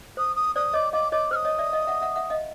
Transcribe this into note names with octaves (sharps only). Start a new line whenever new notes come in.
C5 D#6
D#6
C5 D5 D#6
C#5 D#5 D6
D#5 F5 D6
C#5 D#5 D6
C5 D#6 F6
C#5 D#5
D5 E5
D#5 F5
E5 F#5
E5 F#5
E5 F#5
D#5 F5